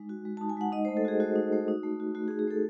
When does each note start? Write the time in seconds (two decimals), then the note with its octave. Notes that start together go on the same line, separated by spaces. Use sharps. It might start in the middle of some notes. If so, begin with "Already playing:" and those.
Already playing: G#3 D#4
0.09 F#4
0.25 G#3
0.37 D#4 A5
0.49 G#5
0.57 G#3 F#5
0.72 D#4 D#5
0.85 A3 C5
0.97 A4
1.05 F#4 G#4
1.20 A3 F#4
1.36 D#4
1.52 A3
1.68 D#4
1.83 A3
2.00 F#4
2.15 A3 F#4
2.28 G#4
2.31 D#4
2.39 G#4
2.47 A3 A4